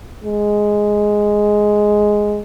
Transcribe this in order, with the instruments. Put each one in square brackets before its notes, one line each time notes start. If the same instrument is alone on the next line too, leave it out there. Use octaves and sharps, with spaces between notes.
[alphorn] G#3